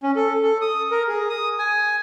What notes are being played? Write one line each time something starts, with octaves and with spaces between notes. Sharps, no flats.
C#4
A4
A4
D#6
A#4
G#4
D#6
G#5